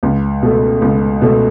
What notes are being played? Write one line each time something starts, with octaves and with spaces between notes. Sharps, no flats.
C#2
B2 A3
C#2
B2 A3